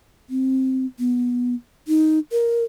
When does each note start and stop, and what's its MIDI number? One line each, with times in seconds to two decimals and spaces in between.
0.29 0.86 60
0.99 1.54 59
1.88 2.19 63
2.32 2.64 70